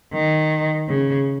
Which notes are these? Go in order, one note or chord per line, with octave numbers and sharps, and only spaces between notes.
D#3
C#3